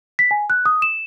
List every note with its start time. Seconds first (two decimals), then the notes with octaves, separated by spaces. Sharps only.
0.19 B6
0.31 G#5
0.50 F#6
0.66 D#6
0.82 E7